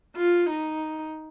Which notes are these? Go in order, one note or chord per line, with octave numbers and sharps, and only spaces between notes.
F4
D#4